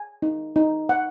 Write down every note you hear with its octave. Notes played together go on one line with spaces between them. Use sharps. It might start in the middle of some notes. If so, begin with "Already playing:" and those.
Already playing: G#5
D#4
D#4
F#5